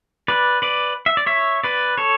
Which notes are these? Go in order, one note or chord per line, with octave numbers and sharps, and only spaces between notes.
B4 D5
B4 D5
E5
D5
C#5 E5
B4 D5
A4 C#5